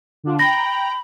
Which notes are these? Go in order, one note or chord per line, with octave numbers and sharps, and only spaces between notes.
D3 D4 F4
G5 A#5 B5 A#6